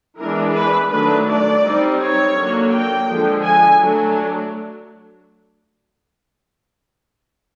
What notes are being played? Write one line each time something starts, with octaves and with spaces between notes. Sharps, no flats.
E3 G#3 B3 D4 A#4
B4
D#3 F#3 A3 D4 B4
D5
G3 C4 D#4
C#5
D3 F#3 A#3
G5
D3 F3 G#3
G#5
F#3 A3 D4